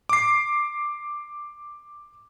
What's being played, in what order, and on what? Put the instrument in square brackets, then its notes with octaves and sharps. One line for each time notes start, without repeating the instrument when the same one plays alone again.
[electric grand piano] D6 C7